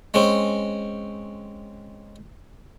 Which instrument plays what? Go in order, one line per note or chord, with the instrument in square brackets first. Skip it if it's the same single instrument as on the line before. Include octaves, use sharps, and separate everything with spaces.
[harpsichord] G#3 C4 C#4